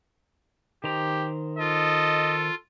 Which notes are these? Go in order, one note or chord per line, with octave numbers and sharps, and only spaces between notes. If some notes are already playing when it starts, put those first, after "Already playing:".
D#3 G4 C5 A#5
F4 A4 D#5